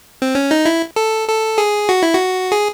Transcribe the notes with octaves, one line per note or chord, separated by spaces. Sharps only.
C4
C#4
D#4
E4
A4
A4
G#4
F#4
E4
F#4
G#4